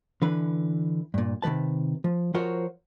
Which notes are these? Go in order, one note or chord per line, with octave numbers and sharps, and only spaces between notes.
D3 E3 B4
G2 A#2
C3 D#3 F3 B4 A5
F3
F3 F4 F#4 A#4 C5 C#5